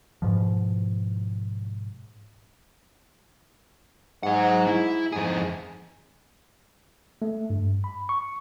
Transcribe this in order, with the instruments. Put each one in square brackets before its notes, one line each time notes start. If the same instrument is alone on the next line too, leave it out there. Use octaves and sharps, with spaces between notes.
[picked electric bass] G#2 B2 F3
[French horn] G#2 [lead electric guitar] F#3 F#5
[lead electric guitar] E4
[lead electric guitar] F2 G#4 [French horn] G#2
[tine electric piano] A3
G2
B5
C#6